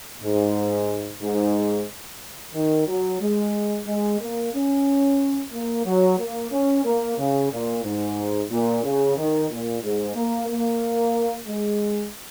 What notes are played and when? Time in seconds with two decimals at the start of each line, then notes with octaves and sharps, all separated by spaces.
0.22 G#2
1.22 G#2
2.54 D#3
2.87 F#3
3.20 G#3
3.86 G#3
4.20 A#3
4.53 C#4
5.53 A#3
5.85 F#3
6.18 A#3
6.51 C#4
6.84 A#3
7.18 C#3
7.51 A#2
7.83 G#2
8.50 A#2
8.84 C#3
9.17 D#3
9.50 A#2
9.82 G#2
10.15 A#3
10.48 A#3
11.47 G#3